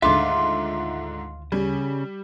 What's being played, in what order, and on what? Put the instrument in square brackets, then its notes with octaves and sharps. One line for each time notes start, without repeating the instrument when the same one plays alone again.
[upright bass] D2 D#3 [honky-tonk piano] G#2 D3 [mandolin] F4 [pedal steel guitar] E5 D6
[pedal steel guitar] C#3 [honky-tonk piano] G3